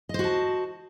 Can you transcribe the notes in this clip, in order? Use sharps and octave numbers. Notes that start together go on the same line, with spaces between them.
F#4 C5 D#5 A5